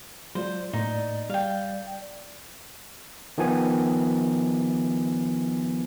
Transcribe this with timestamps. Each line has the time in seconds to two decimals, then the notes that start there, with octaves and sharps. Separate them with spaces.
0.35 F#3 G#3 F4 C5 D5
0.73 A2 A#3 D#4
1.30 G3 F5 G5
3.38 D#3 F3 B3 G#5